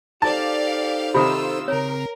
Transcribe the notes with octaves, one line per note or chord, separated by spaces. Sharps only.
D#4 G4 A4 C5 D5 F5 A5
C3 D#3 F4 B5 E6
C#3 C4 A#4 C#5